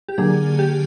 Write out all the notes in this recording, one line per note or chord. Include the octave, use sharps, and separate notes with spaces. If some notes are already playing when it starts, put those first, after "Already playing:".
G4
D3 F#3 A#3 D4 G#4
G4